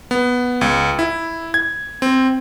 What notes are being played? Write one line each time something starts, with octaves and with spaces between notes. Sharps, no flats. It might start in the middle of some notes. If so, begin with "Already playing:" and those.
B3
C#2
E4
G#6
C4